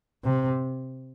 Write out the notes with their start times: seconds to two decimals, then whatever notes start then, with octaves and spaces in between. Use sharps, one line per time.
0.24 C3